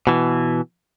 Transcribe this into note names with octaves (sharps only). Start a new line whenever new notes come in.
B2 E3